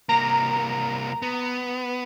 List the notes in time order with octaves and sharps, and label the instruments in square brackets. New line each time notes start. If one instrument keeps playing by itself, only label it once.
[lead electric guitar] C2 A#3 [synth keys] A#5
[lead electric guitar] B3